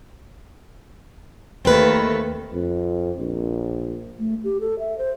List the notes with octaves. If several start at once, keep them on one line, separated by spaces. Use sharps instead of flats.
D#2 A3 C4 A#4 B4
F2
A#1
A3
G4
A4
E5
C5